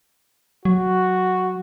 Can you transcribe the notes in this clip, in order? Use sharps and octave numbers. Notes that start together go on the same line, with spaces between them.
F#3 F#4